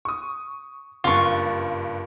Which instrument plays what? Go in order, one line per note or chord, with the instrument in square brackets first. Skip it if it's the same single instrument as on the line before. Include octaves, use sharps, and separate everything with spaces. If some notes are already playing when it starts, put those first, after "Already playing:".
[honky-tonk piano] C#6 D#6
[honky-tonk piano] F#1 G2 [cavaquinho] F4 C#6